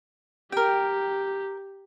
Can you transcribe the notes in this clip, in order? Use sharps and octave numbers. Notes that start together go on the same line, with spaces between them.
G4 A#4 G5